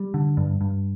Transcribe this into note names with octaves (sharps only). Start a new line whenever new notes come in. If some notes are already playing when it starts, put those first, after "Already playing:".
Already playing: G3
D3
G2
G2